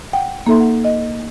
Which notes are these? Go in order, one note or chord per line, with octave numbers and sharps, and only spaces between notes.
F#5 G5
A#3 D#4 A4 E5 C6
F#5
D#5